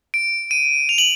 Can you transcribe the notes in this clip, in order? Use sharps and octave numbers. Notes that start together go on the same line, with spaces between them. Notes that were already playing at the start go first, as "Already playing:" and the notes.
D7
D#7
F7
F#7